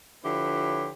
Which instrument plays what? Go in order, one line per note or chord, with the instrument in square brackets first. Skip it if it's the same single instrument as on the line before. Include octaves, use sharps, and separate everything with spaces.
[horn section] D3 F3 E4 G4 B4 C#5